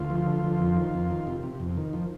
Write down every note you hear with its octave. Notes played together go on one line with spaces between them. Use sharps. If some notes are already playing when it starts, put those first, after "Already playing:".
Already playing: D2 F4
F3
D3
F3
F2
D#3
F2
D#3
C3
C3
F2
D#3
F3